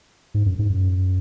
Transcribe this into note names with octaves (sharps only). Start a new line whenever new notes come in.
G#2
F#2
G#2
F#2